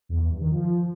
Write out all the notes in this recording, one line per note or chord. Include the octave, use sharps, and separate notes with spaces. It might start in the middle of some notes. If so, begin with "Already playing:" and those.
E2
E2
G2
D#3
F3